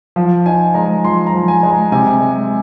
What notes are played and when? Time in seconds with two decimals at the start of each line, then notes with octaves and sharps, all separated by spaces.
0.16 F3 F5
0.46 D#4 G#5
0.74 G#3 A#5
1.04 F3 C6
1.26 A#5
1.33 F3
1.48 G#5
1.63 G#3
1.69 A#5
1.92 C3 G#5
2.21 G#3